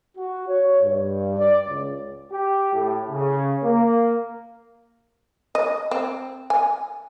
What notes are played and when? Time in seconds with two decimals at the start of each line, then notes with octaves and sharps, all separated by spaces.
0.17 F#4
0.48 C#5
0.82 G2
1.38 D5
1.69 C#2
2.31 G4
2.73 A2
3.09 C#3
3.63 A#3
5.55 D#5
5.91 C4
6.50 G#5